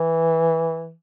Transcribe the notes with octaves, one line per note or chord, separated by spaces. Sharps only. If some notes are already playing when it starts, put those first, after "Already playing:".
Already playing: E3